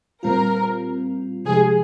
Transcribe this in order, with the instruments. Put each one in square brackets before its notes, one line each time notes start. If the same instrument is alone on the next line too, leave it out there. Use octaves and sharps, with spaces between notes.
[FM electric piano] A#2 G3 C4 F4 [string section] A#4
[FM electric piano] C3 F3 G#3 D#4 G4 [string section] G#4